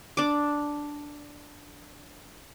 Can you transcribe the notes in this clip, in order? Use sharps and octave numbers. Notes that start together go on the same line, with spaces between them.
D4 D6